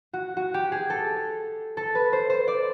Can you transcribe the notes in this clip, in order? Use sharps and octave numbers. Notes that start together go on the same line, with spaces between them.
F#4
F#4
G4
G#4
A4
A4
B4
C5
C5
D5